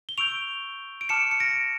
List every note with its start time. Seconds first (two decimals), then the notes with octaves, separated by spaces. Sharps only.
0.09 G7
0.18 C#6 E6 G6 D7 F7
1.01 D7
1.09 A5 D6 F6 C#7 E7
1.31 C#7
1.40 A#6 D7